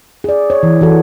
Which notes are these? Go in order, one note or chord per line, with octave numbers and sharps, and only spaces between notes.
G#4 D5
C#5
E3
E3 F#4 A4